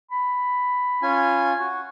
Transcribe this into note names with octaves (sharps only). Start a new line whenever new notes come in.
B5
C#4 F4 G#5
F#4